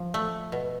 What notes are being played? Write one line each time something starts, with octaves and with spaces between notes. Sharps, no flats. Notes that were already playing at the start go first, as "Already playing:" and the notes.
Already playing: F3
A3
B2